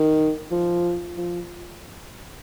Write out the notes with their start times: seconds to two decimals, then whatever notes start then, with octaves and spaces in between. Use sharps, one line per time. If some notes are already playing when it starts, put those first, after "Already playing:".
Already playing: D#3
0.51 F3
1.17 F3